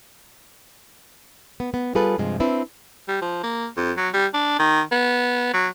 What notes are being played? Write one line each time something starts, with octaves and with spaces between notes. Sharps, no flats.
B3
B3
G3 F4 G#4 A4 B4
G2 C3 F3 G#3
C4 D4 E4 B4
G3
F3
A#3
F2
F#3
G3
D4
D#3
B3
F#3